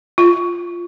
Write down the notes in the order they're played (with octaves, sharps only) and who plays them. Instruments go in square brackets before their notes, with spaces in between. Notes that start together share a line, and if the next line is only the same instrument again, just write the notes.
[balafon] F4